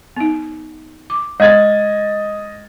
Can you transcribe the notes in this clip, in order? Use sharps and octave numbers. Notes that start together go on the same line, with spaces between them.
B3 D#4
D6
G#3 D5 D#5 G#6 A6